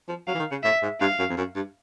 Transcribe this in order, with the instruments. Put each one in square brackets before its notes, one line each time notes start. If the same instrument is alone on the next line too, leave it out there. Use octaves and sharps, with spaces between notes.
[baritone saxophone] F3
[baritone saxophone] F#3 [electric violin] F5
[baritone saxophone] E3
D#3
C#3
[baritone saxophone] A2 [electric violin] E5
[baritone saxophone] G#2
[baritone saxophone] G2 [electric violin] F5
[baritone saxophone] F#2
F2
F#2
G2